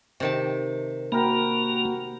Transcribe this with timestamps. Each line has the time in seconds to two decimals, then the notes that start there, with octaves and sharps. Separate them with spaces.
0.20 C3 D#3 A5
1.12 A#3 F#4 A#4 G5 B5